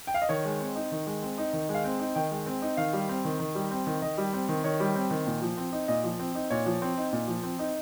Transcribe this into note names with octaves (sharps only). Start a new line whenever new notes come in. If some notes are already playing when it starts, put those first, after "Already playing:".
G5
F5
D#5
D#3 C#5
G#3
C4
D#4
D#3
G#3
C4
D#4
D#3
G#3
F5
C4
D#4
D#3 G5
G#3
C4
D#4
D#3 F5
G3
C4
D#3
D#3
G3
C4
D#3
D#3 D#5
G3
C4
D#3
D#3 C#5
G3
C4
D#3
A#2
F3
C4
D#4
A#2 D#5
F3
C4
D#4
A#2 C#5
F3
C4
D#4
A#2
F3
C4
D#4